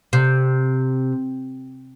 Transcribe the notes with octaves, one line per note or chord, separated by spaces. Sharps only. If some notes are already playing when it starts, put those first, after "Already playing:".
C3